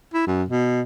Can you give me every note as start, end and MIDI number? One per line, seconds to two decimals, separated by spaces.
0.14 0.24 64
0.27 0.44 42
0.49 0.82 47